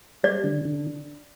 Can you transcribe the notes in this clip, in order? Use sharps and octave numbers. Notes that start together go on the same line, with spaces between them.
G3 D5
D3
D3